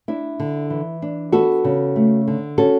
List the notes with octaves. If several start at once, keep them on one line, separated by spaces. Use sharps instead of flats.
D4 E4
D3
E3
D4
B3 F#4 A4
C#3
A3
D3
C#4 F#4 A4